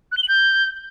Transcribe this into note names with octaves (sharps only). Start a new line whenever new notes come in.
F#6
G7
F#7
G6